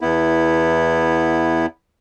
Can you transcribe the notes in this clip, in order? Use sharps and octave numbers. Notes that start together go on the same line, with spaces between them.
E2 B3 E4